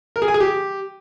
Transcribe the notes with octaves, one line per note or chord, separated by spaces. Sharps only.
A#4
G#4
G#5
G#4
G4